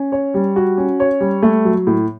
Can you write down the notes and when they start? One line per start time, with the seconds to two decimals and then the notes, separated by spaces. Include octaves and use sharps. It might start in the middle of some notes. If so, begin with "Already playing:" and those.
Already playing: C#4
0.12 C#5
0.34 G3
0.56 F#4
0.78 C#4
1.00 C#5
1.21 G3
1.43 A3
1.65 F#3
1.87 A2